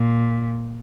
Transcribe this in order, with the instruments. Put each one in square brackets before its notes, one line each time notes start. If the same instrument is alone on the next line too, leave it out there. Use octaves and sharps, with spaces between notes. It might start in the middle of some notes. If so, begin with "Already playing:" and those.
Already playing: [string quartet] A#2